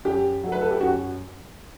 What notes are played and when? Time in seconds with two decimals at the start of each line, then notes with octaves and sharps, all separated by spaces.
0.05 F#2 G4
0.44 F#3 A3
0.52 B4
0.61 A4
0.71 G4
0.81 F#2 F#4